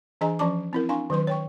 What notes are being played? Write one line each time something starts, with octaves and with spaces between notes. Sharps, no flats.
E3 D4 G#4 D#5 G#5 A#5
E3 F3 C#4 D5 A5 D6
C4 E4 A#4
D4 F5 G#5 C6 C#6
D#3 F#3 B4 C6
C#5 G5 C#6